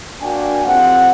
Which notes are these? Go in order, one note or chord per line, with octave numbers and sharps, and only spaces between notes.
A#3 D4 F#4 G5 G#5
F2 C4 G4 F#5